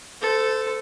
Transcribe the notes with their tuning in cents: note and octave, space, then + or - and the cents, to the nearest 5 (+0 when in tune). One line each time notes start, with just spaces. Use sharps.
A4 +0 C5 -30